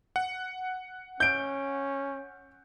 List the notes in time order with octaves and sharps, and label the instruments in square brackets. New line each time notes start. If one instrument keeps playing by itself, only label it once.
[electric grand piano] F#5
[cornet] C#4 [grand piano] G6 D7